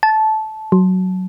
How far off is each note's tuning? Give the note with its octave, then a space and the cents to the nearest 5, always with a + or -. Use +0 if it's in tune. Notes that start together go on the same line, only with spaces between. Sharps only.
A5 -15
F#3 +5